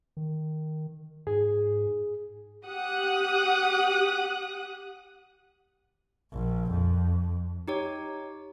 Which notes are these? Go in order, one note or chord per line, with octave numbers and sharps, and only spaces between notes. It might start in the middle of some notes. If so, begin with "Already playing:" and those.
D#3
G#2 G#4
G4 F#5 D#6 F#6
A#1
F2
D#4 G4 C#5